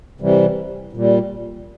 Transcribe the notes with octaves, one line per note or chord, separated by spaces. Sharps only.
C3 E3 G3
A#2 G3